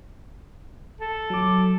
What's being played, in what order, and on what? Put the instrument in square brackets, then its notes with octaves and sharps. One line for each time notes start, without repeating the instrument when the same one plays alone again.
[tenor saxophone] A4
[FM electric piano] F#3 D6